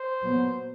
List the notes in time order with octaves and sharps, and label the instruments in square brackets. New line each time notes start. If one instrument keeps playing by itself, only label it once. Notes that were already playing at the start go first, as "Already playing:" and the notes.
Already playing: [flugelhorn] C5
[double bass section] A#2 F#3 B3